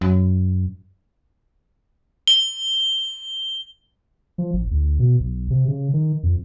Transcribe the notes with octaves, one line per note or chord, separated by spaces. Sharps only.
F#2
G7
F3
A1
D2
B2
B1
C3
C#3
D#3
F2